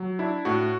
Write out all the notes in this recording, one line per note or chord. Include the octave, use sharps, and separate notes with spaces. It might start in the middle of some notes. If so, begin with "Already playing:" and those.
Already playing: F#3
D4 E4
A2 F#4